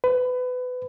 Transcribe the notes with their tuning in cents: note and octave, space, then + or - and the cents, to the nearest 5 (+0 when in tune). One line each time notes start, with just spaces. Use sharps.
B4 +25